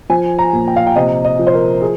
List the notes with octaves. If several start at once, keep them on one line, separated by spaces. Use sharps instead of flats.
F3 G#5
A#5
A#2
G5
F5
G5
C3 D#5
D#5
F3
C5
A#4
G#4